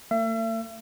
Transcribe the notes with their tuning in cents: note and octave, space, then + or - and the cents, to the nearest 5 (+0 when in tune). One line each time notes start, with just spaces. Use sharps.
A3 +45 E5 +40